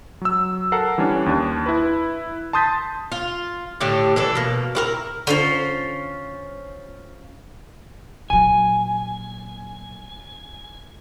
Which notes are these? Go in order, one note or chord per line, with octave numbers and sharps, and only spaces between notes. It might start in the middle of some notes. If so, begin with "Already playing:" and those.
F#3 E6
A4 A#4 F#5 C7
E3 G3 C#4 D4
D#2 D4
E4 B4
A5 C6 D#6 G6 A6 B6
F4
A2 D3 A3 G4
E3 D4 A4
B2 A#3
E4 F#4 A#4
D3 C#4 F4 C5
A#2 F#3 G#5